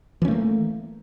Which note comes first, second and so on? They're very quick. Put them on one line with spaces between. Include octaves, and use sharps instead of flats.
E3 C#4 A3 A#3